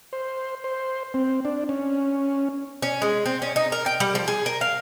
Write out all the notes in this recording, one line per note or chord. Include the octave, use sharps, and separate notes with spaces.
C5
C5
C4
D4
C#4
C#4
G#3
C4
C#4
D#4
A#4
G5
G3
F3
G#4
A#4
F5